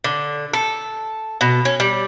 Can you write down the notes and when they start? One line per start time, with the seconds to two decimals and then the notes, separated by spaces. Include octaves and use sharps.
0.04 D3
0.53 A4
1.41 B2
1.65 C#4
1.80 G3